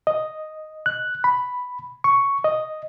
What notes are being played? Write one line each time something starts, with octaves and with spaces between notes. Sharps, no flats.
D#5
F#6
B5
C#6
D#5